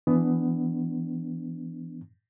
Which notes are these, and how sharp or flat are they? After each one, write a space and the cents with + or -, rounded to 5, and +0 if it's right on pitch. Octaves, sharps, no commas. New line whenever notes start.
E3 +15 B3 +15 D4 +0